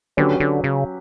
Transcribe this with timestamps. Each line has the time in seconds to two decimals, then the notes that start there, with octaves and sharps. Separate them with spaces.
0.17 D3 F#3 C#4 G4 B4
0.40 D3
0.64 C#3